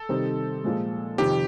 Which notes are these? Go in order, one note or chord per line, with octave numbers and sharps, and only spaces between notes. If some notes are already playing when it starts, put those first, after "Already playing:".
Already playing: A4
C3 D#3 G3 C4 D#4
A#2 F3 G#3
F2 C3 D#3 G4